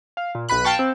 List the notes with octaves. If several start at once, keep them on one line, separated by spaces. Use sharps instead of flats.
F5
A#2
B1 B4 B5 F#6
F5 G5 A5 C#6
C4